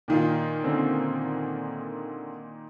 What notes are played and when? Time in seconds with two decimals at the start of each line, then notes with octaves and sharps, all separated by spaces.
0.08 A#2 D#3 F4
0.64 D3 C4 C#4